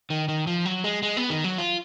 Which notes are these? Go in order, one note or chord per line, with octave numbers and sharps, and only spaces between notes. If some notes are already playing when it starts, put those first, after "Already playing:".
D#3
D#3
F3
F#3
G#3
G#3
B3
D#3
F#3
F4